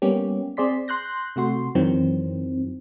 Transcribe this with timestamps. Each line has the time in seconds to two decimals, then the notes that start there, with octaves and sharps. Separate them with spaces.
0.02 G3 A#3 B3 C#4 G4
0.57 C4 G#4 D5 C6 B6
0.88 C6 F#6 G6 A#6
1.36 C3 A3 F#4 C6
1.75 F#2 D#3 E3 F#3 C4